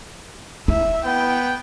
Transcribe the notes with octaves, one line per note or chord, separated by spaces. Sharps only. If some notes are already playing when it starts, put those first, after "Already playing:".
E4 E5
B3 G5